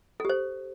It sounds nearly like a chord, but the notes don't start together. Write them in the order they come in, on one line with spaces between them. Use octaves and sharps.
A4 G4 C5